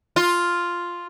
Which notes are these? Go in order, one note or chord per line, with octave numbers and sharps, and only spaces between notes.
F4